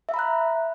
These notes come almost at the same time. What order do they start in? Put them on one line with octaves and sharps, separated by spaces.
E5 F5 B5 A#5 F#6